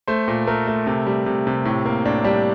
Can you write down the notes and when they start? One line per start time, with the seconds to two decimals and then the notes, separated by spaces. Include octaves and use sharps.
0.08 A3 C5
0.28 A#2
0.47 A3 A#4
0.67 A3
0.87 C3
1.07 G3
1.26 C3
1.47 C3
1.65 A2
1.86 A#3
2.05 A2 D4
2.24 G3 D4